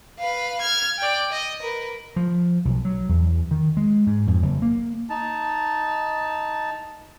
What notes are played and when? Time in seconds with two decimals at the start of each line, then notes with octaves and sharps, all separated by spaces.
0.19 B4 F5
0.61 F6 G#6
0.97 D5 G5
1.32 D#5
1.62 A#4 B4
2.16 F3
2.65 B1
2.85 F#3
3.09 E2
3.51 D#3
3.77 G#3
4.07 G#2
4.27 F2
4.42 F#1
4.62 A#3
5.10 D#4 A5